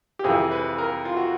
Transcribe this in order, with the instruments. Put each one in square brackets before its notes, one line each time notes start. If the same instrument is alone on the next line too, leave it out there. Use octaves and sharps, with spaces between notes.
[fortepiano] G4
F2 C3 E3 G#4
B4
A#4
F4
F#4